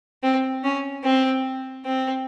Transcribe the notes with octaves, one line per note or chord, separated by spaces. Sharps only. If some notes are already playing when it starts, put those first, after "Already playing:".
C4
C#4
C4
C4